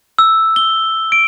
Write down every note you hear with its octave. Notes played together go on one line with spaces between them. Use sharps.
E6
G7
D7